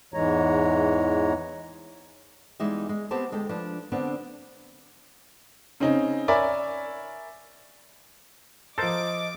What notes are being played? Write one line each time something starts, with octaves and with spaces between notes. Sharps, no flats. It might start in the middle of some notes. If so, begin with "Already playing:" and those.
E2 G#2 E3 G#3 C#5 A#5
E2 E3 G3 G#3 D#4 E5
G#3
B3 C4 G4 C5 A5
D2 G#3 A4 G5
F3 D4 B4
D3 B3 C4 D4
C#3 C4 C#4 D#4
A#4 C#5 D5 E5 G#5 B5
F3 A4 A#4 C5 D#5 D6 A6